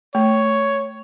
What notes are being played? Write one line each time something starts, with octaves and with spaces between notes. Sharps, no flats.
A3 C#5